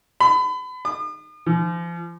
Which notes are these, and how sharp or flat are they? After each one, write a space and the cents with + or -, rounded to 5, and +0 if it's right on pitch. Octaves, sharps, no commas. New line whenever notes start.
B5 +35
D#6 -45
F3 -35